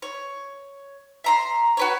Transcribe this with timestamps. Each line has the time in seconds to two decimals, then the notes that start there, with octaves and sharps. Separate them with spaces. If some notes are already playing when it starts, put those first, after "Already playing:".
0.02 C#5
1.24 E5 A#5 C6
1.77 F#4 B4 C#5